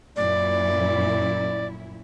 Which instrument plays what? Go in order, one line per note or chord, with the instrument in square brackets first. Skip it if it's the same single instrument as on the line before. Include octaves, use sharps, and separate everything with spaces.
[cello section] F#2 A#2 E4 [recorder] D5